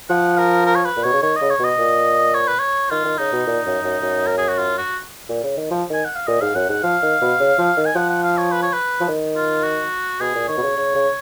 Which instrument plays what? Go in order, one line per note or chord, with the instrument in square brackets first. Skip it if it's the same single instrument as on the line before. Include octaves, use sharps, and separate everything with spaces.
[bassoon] F3 [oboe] F#5
[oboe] A#4
A#4
C#5
B4
[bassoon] A#2
[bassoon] B2 [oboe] C#5
[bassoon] C#3
[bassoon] D#3 [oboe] C#5
[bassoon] C#3 [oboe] D#5
[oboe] C#5
[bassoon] B2 [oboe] D#5
[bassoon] A#2
[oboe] C#5
B4
C#5
[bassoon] D#3 [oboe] F4
[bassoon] D#3
[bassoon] C#3 [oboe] D#4
[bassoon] B2
A#2
F#2
F#2
F#2
[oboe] A#4
G#4
F#4
F4
F#4
[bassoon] A#2
C#3
D#3
F3
[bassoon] D#3 [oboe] G#5
[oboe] F#5
F5
[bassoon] A#2 [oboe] D#5
[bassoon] G#2 [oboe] F5
[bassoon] F#2 [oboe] F#5
[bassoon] G#2 [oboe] F#5
[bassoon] F3 [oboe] F5
[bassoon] D#3
B2
C#3
F3
D#3
[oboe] G#5
[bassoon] F3 [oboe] F#5
[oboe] F#5
F5
C#5
B4
C#5
B4
[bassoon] F3
D#3
[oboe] F4
F#4
[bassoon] B2 [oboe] G#4
[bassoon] A#2
[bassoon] D#3 [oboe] C#5
[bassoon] B2
C#3
C#3
C#3